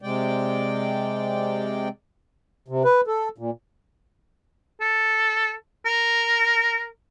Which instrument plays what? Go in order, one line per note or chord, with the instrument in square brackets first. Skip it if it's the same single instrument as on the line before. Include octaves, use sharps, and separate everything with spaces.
[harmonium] C3 G#3 D5 G5
C3
B4
A4
A#2
[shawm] A4
A#4